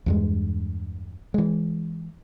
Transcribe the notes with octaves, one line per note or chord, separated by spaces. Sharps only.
E2 G2 G#3
E3 G#3